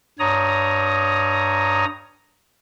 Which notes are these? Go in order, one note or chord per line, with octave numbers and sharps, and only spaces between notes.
G2 C#5 A#5 D#6